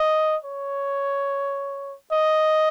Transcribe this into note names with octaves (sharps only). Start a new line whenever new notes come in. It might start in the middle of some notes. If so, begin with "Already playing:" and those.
Already playing: D#5
C#5
D#5